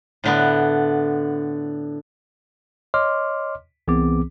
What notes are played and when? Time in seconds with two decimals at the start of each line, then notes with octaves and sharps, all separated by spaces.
0.24 A2 D3 B3
2.94 C#5 D#5 C6 D6 F6
3.88 C2 E3 B3 C4 G#4 D6